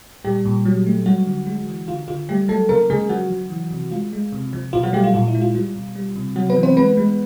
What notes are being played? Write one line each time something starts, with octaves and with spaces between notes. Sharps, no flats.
A#2 G3 G4
A#2
F#3
A3
F#3 G3 F#4
D3
G#3
E3
D3 F4
D3 F4
G3 A3 G4
F#3 A3 A4
C#3 A#3 A#4
C#3 G#3 G#4
F3 F#3 F#4
F3
E3
C3
G#3 F4
G#3
C3
F3
B2 F4
F#3 F#4
G3 A3 G4
F4
A#2 F4
E4
G#3
F4
G3 F4
B2
G3
C3
C3 F#3 F#4
B3 B4
E3
C4 C5
G#3 B3 B4
G#3